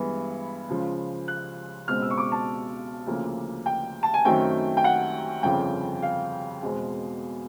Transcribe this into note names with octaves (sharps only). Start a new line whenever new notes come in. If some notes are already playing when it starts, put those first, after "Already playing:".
Already playing: G2 E3 G#3 B3
C#2 C#3 F3
F#6
C#2 B2 G#3 C4 F6
E6
C#6
D6
A5
D2 C#3 F3 A#3
G5
A5
G#5
F#2 D#3 F#3 A3 C4 G5
G5
F#5
G1 F2 C#3 F3 G5
F5
E2 B2 G#3 C4